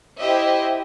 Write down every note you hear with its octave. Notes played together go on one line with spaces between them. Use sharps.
E4 G4 C5 D#5 E5